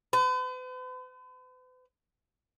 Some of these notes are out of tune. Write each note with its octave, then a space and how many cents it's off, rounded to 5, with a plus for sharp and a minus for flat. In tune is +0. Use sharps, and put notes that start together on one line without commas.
B4 +45